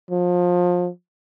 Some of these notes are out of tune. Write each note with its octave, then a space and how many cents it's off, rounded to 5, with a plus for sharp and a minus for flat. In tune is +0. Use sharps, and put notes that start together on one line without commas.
F3 +25